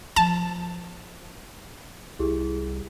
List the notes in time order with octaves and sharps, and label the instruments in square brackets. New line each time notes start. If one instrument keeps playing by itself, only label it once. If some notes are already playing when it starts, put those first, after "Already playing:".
[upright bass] F3 [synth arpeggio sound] A5
[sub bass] C2 [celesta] E4 G4 G#4